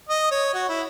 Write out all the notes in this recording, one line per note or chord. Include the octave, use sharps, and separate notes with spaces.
D#5
C#5
F#4
E4